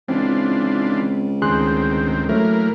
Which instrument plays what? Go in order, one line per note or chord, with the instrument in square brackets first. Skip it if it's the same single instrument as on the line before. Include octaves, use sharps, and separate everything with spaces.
[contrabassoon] C#2 [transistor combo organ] E3 D4 F4 [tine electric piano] C4
[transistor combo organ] D2 D#3 C4 [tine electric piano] G#4 C6 F#6
[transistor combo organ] E3 A#3 A#4 [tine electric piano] F#3 A3